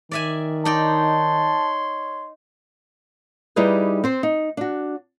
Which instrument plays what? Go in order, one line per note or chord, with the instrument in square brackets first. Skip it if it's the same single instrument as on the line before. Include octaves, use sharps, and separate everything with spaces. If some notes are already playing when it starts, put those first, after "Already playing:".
[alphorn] D#3 [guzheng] D5 E5 G#5
[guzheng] D#4 D5 G5 [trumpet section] C#5 C6 [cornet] A5
[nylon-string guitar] G3 D#4 E4 G4 G#4 B4
C4 C5
D#4
D4 F#4